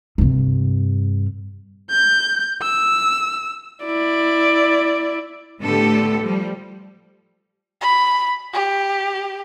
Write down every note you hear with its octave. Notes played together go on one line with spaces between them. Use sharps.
G2 C3
G6
E6
E4 D5
A2 D3 A3 B3 G4 A4
F3 G3
B5
G4